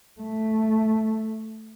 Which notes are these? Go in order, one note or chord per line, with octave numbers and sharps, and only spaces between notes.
A3